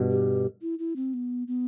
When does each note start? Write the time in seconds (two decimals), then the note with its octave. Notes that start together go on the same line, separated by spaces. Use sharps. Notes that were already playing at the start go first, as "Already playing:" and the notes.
Already playing: G2 B2
0.10 G4
0.62 E4
0.79 E4
0.96 C4
1.14 B3
1.48 B3